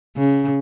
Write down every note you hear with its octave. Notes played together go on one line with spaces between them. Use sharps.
C#3